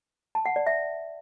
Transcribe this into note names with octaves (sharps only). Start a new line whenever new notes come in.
A5
F#5
D5
E5